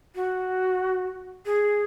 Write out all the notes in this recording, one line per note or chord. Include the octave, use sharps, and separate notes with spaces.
F#4
G#4